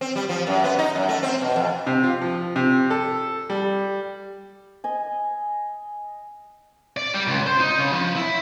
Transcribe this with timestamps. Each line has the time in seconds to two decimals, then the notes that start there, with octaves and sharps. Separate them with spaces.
0.01 C4
0.16 G3
0.29 F3
0.47 F#2
0.64 B3
0.79 D#4
0.95 F#2
1.09 A3
1.23 C4
1.42 B2
1.56 F2
1.87 C3
2.03 F4
2.21 F3
2.56 C3
2.90 A4
3.50 G3
4.84 D#5 G#5
6.97 D5
7.14 G3
7.27 C#2
7.47 C5
7.60 D#4
7.78 C#3
7.93 F3
8.16 E4